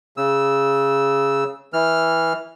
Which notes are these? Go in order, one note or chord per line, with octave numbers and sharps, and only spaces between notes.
C#3 E6
E3 F6